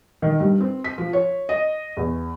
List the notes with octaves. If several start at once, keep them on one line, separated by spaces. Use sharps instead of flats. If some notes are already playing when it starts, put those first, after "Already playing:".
D#3
G2
C4
B6
F3
C#5
D#5
E2